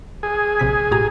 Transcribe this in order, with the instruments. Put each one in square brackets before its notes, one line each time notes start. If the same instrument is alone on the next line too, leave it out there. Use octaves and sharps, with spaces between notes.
[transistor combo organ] G#4
[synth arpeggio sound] A#1 C3 B6
A2 G4 A#5